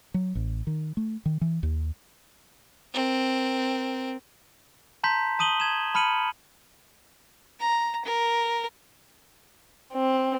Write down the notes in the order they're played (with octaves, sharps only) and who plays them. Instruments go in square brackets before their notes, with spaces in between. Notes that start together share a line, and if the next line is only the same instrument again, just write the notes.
[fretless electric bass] F#3
A1
D#3
A3
D#3
E3
D#2
[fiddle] C4 A#4
[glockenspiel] A5 A#5 C6 G6 B6
A5 D#6 D#7 F#7 G7
G#6 E7
A5 B5 F6 C#7 D#7 F#7
[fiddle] A#5
A#4
[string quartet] C4